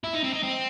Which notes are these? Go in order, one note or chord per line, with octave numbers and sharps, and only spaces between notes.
E4
D#4
C4
D#4
C4